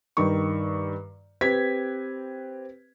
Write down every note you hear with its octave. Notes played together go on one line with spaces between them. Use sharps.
G2 D#3 C#6
C4 G4 B4 G#6 B6